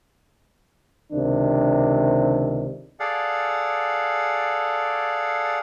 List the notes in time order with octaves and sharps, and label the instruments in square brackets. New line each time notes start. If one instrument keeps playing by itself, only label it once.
[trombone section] C#2 C3 D#3 D4
[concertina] G#4 A4 D5 F5 F#5